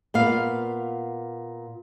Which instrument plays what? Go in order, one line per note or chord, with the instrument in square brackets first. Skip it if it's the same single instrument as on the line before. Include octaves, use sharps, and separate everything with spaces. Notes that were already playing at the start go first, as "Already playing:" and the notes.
[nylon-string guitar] A#2 B3 F5